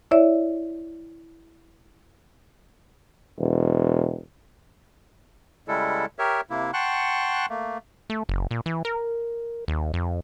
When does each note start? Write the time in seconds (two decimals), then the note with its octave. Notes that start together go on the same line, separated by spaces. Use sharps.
0.11 E4 C#5 D5 E5
3.39 E1
5.68 C#3 G3 G#3 E4 A4
6.19 G4 A#4 C#5 E5
6.50 C3 A#3 E4
6.73 F#5 G5 A5 C6 C#6 F#6
7.50 A3 A#3
8.10 A3
8.29 F#1
8.51 A#2
8.66 E3
8.85 A#4
9.68 D#2
9.94 F2